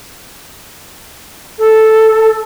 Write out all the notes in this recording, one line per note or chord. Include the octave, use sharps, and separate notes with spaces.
A4